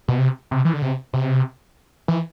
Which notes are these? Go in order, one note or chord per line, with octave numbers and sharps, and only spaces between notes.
B2
C3
C3
E3
D3
C3
C3
E3